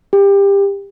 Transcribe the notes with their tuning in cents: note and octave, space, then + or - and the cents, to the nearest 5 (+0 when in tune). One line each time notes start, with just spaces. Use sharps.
G4 +25